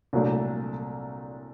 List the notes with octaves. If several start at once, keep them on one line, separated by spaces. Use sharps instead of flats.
C2 A#2 F#3 A3 D4